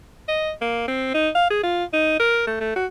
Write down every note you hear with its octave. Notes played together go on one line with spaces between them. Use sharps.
D#5
A#3
C4
D#4
F5
G#4
F4
D#4
A#4
A3
A3
F#4